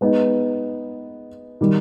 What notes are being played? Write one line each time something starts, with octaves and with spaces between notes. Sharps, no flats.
G#3 B3 D#4
D#3 G3